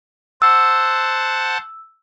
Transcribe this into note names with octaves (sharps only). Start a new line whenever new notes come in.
C5 F#5 A5 E6